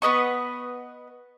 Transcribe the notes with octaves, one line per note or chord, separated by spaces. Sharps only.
B3 B4 D#5 C#6